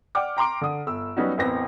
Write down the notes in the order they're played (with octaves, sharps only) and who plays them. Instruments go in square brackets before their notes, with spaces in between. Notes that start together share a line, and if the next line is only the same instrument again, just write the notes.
[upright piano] D5 F#5 G5 D6 F6
G5 A#5 C6 D6 D7
D3 D#6
G1 E6
F#3 G3 B3 C#4 D#4 F#4
E1 A1 C4 B4 A#6